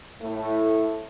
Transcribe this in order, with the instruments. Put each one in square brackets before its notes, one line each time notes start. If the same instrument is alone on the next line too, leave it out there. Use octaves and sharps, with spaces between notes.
[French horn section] A2 A3